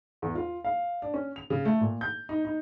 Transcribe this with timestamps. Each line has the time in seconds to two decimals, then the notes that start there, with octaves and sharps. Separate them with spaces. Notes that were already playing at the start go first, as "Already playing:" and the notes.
0.22 E2
0.35 F4
0.64 F5
1.02 D4
1.14 C#4
1.36 F7
1.50 C#3
1.65 A3
1.81 A#2
2.01 G6
2.29 D#4
2.45 D#4